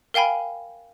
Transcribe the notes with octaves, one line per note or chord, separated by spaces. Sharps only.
A#4 F5 G5 G#5 B5